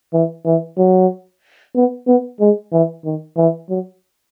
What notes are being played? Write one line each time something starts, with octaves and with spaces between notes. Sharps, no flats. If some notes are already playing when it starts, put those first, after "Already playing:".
E3
E3
F#3
B3
B3
G#3
E3
D#3
E3
F#3